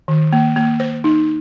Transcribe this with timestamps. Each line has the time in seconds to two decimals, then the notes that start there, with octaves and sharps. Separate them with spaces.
0.08 D#3
0.33 A#3
0.56 A#3
0.80 C5
1.04 D#4